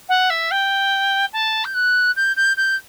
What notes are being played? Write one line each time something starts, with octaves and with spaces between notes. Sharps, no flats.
F#5
E5
G5
A5
G6
F#6
G6
G6
G6